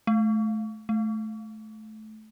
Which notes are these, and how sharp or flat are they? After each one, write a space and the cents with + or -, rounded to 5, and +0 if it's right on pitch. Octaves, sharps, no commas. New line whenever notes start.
A3 -25
A3 -20